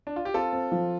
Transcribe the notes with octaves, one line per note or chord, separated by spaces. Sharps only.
D4
F4
G4
C4 F4 A4
C4
F3